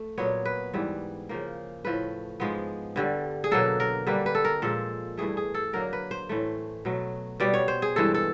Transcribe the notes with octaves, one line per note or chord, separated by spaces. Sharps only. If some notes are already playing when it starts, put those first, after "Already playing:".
Already playing: A3
A#2 F#3 B3 C#5
B4
G#2 E3 G3 B3
C#3 F3 A#3
A2 F3 A3 B4
G#2 F3 G#3 B3
G2 D3 G3
G#4
B2 F#3 A#3 A4
A#4
D3 G3 A#3 B4
B4
A4
A#4
A#2 F3 G#3 A4
G2 E3 A3 G#4
G#4
A4
D3 F#3 A#3 A#4
B4
C5
A2 E3 A3
B2 F#3 A3
B2 G3 B3 D5
C#5
C5
G#4
G2 E3 G#3 A4
A4